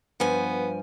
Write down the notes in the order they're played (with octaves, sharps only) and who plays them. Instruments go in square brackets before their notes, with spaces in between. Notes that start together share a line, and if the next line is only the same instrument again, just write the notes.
[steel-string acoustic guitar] G2 F3 G#5 [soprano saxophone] B3